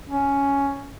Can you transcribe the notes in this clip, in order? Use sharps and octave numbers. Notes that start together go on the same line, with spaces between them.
C#4